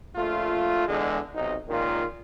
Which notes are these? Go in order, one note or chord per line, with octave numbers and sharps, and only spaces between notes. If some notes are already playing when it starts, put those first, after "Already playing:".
A#1 A3 F4
E2 D3 G#3
B1 C3 D#4
C#2 A#2 D#3 F4